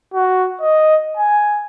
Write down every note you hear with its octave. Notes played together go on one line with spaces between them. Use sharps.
F#4
D#5
G#5